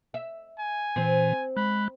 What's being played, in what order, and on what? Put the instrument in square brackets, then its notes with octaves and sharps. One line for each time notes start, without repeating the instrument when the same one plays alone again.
[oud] E5
[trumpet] G#5
[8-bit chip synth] A#2 E3 [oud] C4 C5
[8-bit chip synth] G#3 F#6 [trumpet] B5